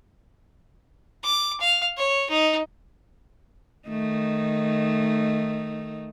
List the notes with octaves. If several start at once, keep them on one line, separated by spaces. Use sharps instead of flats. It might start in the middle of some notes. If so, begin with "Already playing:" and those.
D6
F5
C#5
D#4
D#3 A3 D#4